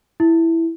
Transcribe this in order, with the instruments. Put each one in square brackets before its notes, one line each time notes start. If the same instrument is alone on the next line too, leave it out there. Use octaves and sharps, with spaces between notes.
[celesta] E4